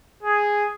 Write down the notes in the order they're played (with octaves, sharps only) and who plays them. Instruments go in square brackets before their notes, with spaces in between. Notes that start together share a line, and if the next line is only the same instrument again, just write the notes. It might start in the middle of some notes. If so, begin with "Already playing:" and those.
[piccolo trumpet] G#4